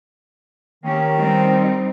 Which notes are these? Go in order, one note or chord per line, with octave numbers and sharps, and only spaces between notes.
D#3 A#3 C#4 G4
G3 C4 D#4